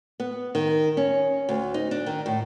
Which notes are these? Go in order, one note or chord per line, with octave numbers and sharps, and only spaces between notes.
B3
D#3
C#4
D2
D#4
D4
D#3
A2